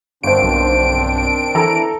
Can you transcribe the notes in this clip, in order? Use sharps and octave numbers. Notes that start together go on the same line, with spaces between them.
G1 D#3 C4 D4 C5 D7
B1
E3 A4 A#5